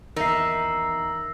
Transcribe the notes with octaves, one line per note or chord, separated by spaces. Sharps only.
E2 D#3 D#4 A#4 E5 E6 A#6 C7